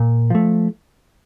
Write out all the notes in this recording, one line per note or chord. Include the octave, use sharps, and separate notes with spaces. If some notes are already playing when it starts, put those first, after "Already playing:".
Already playing: A#2
F3 A3